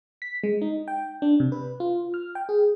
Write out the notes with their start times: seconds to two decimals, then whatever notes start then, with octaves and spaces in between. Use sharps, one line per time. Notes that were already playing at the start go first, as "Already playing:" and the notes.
0.22 B6
0.43 G#3
0.62 D#4
0.88 G5
1.22 D4
1.40 C3
1.52 B4
1.80 F4
2.14 F6
2.35 G5
2.49 G#4